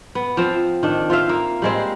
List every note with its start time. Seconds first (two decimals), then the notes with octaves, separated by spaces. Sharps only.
0.15 B3
0.37 F3 C4
0.83 D#3 D4
1.10 F4 C5 E5 F5
1.29 A#3
1.62 G3 G#3 C4